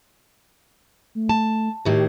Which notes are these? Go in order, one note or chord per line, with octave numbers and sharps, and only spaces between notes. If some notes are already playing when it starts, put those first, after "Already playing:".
A3
A5
A2 D#3 F#4 G4